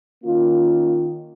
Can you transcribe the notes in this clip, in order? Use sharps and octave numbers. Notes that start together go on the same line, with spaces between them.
D#3 A#3 C#4 F4